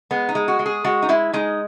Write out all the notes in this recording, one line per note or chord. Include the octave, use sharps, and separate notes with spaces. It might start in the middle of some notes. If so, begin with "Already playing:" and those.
G#3 B3
D#4
G#3
F#4
G#3
G#4
G#3 F#4
D#4
G#3 E4
G#3 D#4